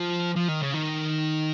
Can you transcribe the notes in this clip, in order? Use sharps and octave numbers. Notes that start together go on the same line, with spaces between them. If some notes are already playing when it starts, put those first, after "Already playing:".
Already playing: F3
F3
D#3
C#3
D#3